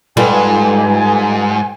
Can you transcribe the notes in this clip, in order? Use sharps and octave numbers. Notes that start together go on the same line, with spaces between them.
G#2 G3 F4 A4 B4 G#5